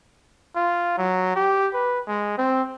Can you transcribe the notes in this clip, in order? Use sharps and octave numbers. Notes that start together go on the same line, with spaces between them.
F4
F#3
G4
B4
G#3
C4